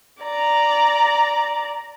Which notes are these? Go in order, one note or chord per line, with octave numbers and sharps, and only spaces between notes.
D5 A#5